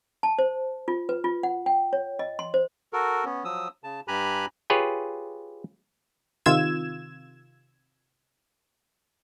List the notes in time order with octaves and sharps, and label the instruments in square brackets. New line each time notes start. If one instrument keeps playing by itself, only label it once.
[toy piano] A5
C5
F4
B4
F4
F#5
G5
C#5
D#5
C6
C5
[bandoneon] F#4 A4 A#4
B3 C#4
F3 F#3 D#6 E6
C#3 A5
G2 G4 G#5 A#5 B5 F#6
[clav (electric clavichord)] F4 G4 G#4 B4 C#5
[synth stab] C3 D#3 F4 E6 G#6 E7